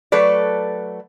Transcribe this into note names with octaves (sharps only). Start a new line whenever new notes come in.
F#3 A3 A4 B4 D5